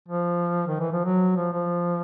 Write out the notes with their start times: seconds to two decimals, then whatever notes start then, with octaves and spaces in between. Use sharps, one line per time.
0.09 F3
0.67 D#3
0.80 E3
0.92 F3
1.05 F#3
1.36 F3
1.53 F3